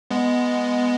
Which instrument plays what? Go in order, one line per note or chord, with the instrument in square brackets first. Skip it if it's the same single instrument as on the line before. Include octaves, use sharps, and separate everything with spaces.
[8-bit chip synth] G#3 B3